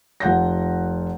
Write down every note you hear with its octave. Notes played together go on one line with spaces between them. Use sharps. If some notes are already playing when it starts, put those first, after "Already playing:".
F1 F4 F#5 G6 A#6